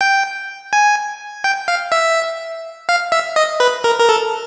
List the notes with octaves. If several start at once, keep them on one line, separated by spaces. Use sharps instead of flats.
G5
G#5
G5
F5
E5
F5
E5
D#5
B4
A#4
A#4
A4